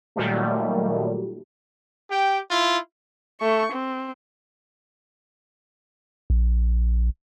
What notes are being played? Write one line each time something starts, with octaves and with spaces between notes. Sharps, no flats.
A#2 D#3 F#3 G3 A3
G4 G5
E4 F4
A3 C#6
C4
A#1